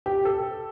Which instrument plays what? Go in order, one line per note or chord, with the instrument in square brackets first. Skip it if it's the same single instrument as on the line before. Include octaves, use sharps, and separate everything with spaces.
[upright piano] G4
A4